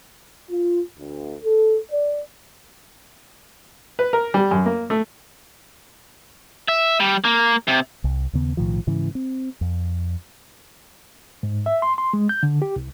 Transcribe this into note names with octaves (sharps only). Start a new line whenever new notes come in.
F4
D2
A4
D5
B4
A#4
G3
F#2
A#3
A3
E5
G3
A#3
C3
C2
D#2 C#3 B3
B1 A2 D#3 F3
G#2 C#3 E3
C4
F2
G#2
E5
C6
C6
G#3
G6
D3
G4
C2